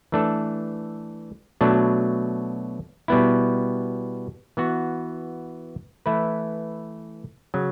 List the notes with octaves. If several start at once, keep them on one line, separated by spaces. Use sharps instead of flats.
E3 A3 D4 A4
B2 F#3 A3 D4
B2 G3 B3 E4
E3 B3 F#4
E3 A3 E4 B4
C#3 F#3